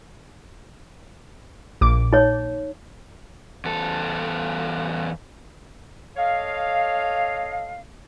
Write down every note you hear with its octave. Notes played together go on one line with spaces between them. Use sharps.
A#1 A#2 D6
D#4 C#5
E2 A4
A4 C#5 D#5 F5